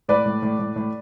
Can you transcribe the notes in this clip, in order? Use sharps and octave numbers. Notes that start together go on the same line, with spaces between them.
A2 B4 D5
A2
A2
A2
A2